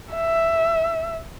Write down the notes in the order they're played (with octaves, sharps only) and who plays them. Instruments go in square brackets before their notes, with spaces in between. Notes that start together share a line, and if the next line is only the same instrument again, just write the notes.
[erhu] E5